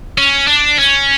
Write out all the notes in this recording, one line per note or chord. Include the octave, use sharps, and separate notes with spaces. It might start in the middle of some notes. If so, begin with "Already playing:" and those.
C#4
D4
C#4